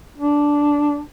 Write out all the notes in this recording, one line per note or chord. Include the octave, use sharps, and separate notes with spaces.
D4